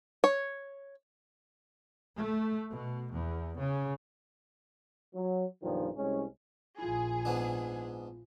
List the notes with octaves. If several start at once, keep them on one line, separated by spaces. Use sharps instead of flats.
C#5
A3
B2
E2
C#3
F#3
B1 G2 A#2 D#3 F3
C2 G#3 C#4
A#1 E4 F4 G#4
G#2 B3 D4